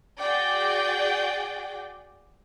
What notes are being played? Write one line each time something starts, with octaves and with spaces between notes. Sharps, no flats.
F#4 G#4 D5 G5